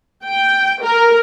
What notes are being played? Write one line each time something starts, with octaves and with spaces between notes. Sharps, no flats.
G5
A#4